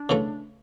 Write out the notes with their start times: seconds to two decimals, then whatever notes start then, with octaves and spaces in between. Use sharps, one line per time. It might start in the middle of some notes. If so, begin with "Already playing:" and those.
Already playing: D4
0.09 C#3 E3 A3